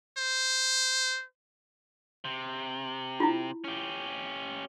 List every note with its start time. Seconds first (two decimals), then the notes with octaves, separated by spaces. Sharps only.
0.18 C5
2.25 C3
3.20 E4 F4
3.64 C#4 G4